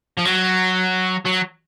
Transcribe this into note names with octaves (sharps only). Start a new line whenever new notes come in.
F3
F#3
F#3